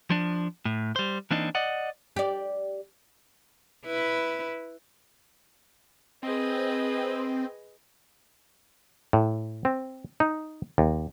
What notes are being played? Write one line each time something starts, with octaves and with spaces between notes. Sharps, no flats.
F3 D4
A2
G3 C5
E3 A#3 C4 D4 D#4
D5 D#5 F#5
G4 D5
E4 B4
C4 G#4 B4 D#5
A2
C4
D#4
D#2